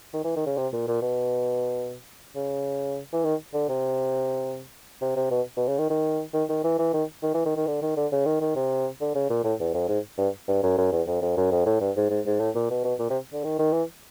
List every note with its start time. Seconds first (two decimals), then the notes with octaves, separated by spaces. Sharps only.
0.14 D#3
0.24 E3
0.36 D#3
0.46 C#3
0.57 C3
0.73 A#2
0.88 A#2
1.02 B2
2.35 C#3
3.13 E3
3.24 D#3
3.54 D3
3.69 C3
5.01 C3
5.16 C3
5.31 B2
5.57 B2
5.68 C#3
5.78 D#3
5.90 D#3
6.34 D#3
6.49 D#3
6.64 E3
6.79 E3
6.93 D#3
7.23 D#3
7.34 E3
7.46 D#3
7.57 D#3
7.67 D3
7.82 D#3
7.96 D3
8.12 C#3
8.26 D#3
8.41 D#3
8.56 C3
9.01 D3
9.15 C#3
9.30 A#2
9.44 A2
9.60 E2
9.74 F2
9.88 G#2
10.18 G2
10.48 G2
10.63 F#2
10.77 F#2
10.92 E2
11.07 F2
11.22 F2
11.37 F#2
11.51 F2
11.66 A2
11.81 G2
11.96 G#2
12.10 G#2
12.26 G#2
12.40 A2
12.55 A#2
12.70 B2
12.84 B2
12.99 A#2
13.10 C3
13.33 D3
13.44 D#3
13.59 D#3
13.73 E3